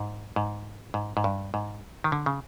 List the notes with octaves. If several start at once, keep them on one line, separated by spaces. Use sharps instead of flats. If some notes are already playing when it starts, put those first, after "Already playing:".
Already playing: G#2
G#2
G#2
G#2
G2
G#2
D#3
D3
C#3